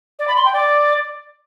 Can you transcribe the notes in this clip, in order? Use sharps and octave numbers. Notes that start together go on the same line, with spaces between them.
D5
B5
C6
G5
D5